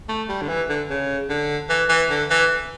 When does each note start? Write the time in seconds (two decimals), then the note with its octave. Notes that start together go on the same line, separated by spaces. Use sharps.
0.09 A3
0.29 G3
0.42 D3
0.48 E3
0.69 D3
0.90 C#3
1.29 D3
1.69 E3
1.89 E3
2.10 D3
2.30 E3